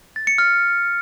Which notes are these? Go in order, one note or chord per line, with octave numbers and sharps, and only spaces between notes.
A6
C#7
F6